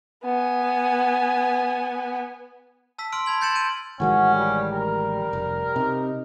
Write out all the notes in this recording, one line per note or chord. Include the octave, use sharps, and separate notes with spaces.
B3 G#5
A5 E6 B6
C6 E6 F6 D7
A5 B5 G#6 F#7
C6 G6 A6 C#7 E7 F#7
G6 A6 D7 D#7 F#7
A1 D#3 G#3 C#4 F#4
G3
G3 A#4
F1
C3 D#4